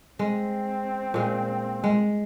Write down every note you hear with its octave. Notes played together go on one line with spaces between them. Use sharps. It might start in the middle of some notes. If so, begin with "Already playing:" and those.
G#3 C4
A#2 G#3
G#3